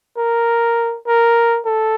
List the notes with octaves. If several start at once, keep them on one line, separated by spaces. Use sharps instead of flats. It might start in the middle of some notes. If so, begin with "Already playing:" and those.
A#4
A#4
A4